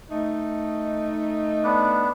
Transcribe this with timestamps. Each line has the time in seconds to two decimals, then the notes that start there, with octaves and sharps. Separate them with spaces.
0.10 A3 D#4
1.63 B3 D4